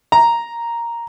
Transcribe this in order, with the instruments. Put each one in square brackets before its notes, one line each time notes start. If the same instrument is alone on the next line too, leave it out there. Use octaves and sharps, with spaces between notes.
[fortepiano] A#5